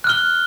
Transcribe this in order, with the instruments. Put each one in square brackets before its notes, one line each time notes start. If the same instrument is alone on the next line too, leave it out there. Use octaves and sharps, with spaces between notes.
[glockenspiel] F#6
F6
G7